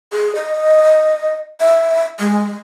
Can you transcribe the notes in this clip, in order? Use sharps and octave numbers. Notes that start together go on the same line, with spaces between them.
G#4
D#5
E5
G#3